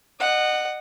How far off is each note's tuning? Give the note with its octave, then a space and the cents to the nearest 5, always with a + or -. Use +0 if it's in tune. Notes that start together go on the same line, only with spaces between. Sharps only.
D#5 -30 F#5 +0